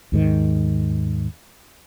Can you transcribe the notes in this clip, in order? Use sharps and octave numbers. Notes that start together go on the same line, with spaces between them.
D#2 G#2 D#3